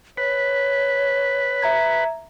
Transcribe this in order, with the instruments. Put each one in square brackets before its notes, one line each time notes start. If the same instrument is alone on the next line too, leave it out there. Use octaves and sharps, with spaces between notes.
[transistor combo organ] B4 [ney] C#5
[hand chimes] E5 A#5 G#6